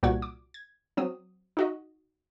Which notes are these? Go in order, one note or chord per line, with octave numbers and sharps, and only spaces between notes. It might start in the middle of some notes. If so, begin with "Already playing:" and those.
C2 A#2 F#4 D5 F#5 G#6
D6
G#6
F#3 C4 D#6
D#4 F#4 D#5